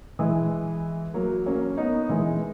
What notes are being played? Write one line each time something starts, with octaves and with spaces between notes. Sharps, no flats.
E3 G#3
F#3 A#3
A#3 C#4
B3 D#4
E3 G#3